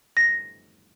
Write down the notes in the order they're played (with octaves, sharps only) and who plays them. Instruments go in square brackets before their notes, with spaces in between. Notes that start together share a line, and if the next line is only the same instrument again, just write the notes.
[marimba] A#6